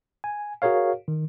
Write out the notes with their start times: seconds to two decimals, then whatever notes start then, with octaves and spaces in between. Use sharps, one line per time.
0.24 G#5
0.62 F#4 G#4 A#4 C#5 F5
1.08 D#3